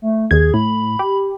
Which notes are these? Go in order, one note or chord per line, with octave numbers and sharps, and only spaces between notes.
A3
D#2 G#4 G#6
A2 B5
G4